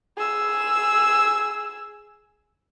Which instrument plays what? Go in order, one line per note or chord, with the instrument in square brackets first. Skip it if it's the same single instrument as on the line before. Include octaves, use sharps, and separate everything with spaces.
[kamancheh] G#4 E6